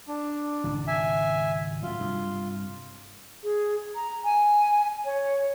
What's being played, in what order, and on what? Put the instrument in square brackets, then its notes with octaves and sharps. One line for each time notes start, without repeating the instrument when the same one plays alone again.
[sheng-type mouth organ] D4
[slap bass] G#1 C#2 B2
[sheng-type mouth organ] E5 G#5
[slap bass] A2 F#3 [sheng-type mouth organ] F4
[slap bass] G2 C3
[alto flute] G#4
A#5
G#5
C#5